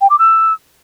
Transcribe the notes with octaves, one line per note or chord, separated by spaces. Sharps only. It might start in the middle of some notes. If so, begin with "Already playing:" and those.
G5
D6
E6